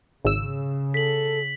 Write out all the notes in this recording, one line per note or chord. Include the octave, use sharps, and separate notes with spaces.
G#1 C#3 E6
A4 B6 F#7